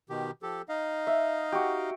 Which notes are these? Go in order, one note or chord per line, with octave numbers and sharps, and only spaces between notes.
B2 D#3 G4
F3 G4 A4
D#4 D#5 F5
E5
F#4 G4